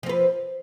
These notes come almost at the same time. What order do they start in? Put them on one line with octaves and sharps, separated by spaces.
F3 C4 B4